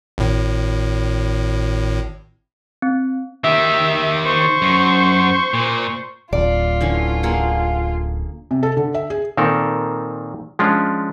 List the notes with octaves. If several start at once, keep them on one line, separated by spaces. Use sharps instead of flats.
G#1 A2
C4
D#3 G4 E5
C5 C#6
F#2
A#2
D1 F4 D5
D3 E3 C#4
A#3 G#4 F#5
C3
A4
D3
E5
G#4
A#2 D#3 C4 A4 A#4
F3 G#3 C#4 D4 F4